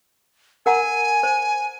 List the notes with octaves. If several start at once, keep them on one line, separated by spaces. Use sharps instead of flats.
A#4 F#5 G#5 A#5
C5